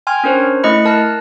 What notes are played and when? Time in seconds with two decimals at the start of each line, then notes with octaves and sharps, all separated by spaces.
0.07 G5 G#5 C6 F6 G#6
0.24 C#4 D4 A#4 C5 C#5
0.64 A3 E4 D#5 B5 C#7
0.85 A#4 A5 F6 F#6 A#6